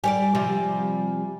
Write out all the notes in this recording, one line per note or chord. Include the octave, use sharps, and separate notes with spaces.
G3 C#5 D5 G#5
C3 F3 G3